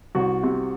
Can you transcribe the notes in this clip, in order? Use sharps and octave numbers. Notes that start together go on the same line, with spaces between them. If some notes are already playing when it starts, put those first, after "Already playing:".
C2 F#4
C3